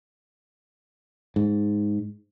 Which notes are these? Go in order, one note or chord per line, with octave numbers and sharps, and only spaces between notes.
G#2